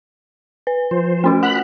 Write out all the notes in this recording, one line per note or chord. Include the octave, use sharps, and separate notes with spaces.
B4
F3 C5
A3 C#4 F#4
F#5 B5 F#6